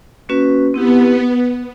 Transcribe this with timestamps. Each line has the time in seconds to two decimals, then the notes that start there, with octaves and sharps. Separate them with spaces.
0.29 A#3 C#4 F#4 B4
0.73 B3 C4 E4 G4